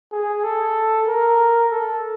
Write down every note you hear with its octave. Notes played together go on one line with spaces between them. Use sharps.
G#4
A4
A#4
A4